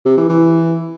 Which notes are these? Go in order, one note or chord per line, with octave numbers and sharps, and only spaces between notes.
C3
E3
E3